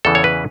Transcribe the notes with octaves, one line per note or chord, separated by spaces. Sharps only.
E2 C#3 E3 A4
C#5
B4